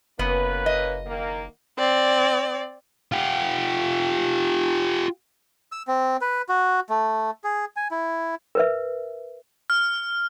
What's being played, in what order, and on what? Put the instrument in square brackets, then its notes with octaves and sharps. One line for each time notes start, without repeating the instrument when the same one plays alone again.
[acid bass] F#1 [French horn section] A#3 C#4 B4 [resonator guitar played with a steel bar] B3
[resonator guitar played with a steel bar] D#5
[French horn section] D#3 A#3
[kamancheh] C4 D5
[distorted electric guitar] F4 G4
[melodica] E6
C4
B4
F#4
A3
G#4
G#5
E4
[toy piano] A#4 B4 E5
[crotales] F6